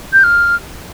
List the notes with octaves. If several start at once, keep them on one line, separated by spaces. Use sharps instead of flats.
G6
F6